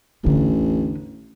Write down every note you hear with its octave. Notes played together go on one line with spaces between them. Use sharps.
A1 E2 D3